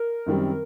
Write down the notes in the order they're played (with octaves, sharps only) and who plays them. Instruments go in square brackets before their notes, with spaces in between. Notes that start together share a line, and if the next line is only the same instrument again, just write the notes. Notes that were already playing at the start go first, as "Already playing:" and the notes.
Already playing: [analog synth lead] A#4
[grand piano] F#2 D#3 G3 C4